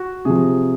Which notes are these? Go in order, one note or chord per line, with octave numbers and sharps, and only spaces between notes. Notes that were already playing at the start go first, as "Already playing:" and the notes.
Already playing: F#4
C3 F3 G#4